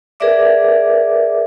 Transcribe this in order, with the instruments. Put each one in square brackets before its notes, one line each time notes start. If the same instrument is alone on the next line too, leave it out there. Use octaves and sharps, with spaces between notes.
[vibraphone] G#4 A#4 B4 D5 E5 D6